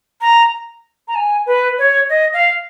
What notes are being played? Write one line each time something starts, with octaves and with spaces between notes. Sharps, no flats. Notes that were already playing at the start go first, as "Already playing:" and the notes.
A#5
A#5
G#5
B4
C#5
D#5
F5